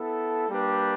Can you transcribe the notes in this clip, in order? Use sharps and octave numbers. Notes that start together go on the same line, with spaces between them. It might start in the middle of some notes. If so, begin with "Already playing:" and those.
Already playing: B3 E4 A4
G3 A#3 D4 G4 B4